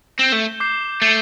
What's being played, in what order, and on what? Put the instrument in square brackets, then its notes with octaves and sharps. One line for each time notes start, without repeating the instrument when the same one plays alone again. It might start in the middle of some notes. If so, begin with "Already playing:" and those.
[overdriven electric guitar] C4 [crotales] G6 E7 G7
[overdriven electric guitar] A3
[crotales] D6 G6 C7
[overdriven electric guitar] A3 [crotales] A6 C7 G7